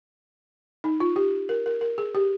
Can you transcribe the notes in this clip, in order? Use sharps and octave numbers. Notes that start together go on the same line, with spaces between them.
D#4
F4
G4
A#4
A#4
A#4
G#4
G4